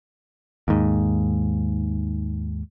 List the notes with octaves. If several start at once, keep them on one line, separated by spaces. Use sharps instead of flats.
D#2 G#2